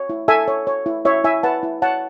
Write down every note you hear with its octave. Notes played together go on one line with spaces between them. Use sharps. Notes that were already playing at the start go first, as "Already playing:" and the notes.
Already playing: C#5
E4
A4 E5 G#5
C#5
C#5
E4
E4 C#5 E5
E4 E5 G#5
B4 F#5 A5
E4
C#5 F#5 A5